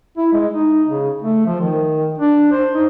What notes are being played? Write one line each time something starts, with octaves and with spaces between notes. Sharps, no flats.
E4
G#3
D#4
C#3
A3
F3
D#3
D4
C5
D#4